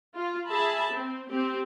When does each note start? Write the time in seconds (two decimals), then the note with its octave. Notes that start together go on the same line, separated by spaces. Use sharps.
0.15 F4
0.47 G#4 E5 A5 B5
0.92 C4
1.29 C4 G4